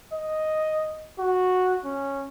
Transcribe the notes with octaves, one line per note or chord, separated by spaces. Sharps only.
D#5
F#4
C#4